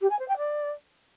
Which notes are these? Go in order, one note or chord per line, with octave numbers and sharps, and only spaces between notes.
G4
G#5
C5
G5
D5